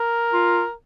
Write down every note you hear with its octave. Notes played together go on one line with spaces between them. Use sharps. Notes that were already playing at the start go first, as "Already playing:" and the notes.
Already playing: A#4
F4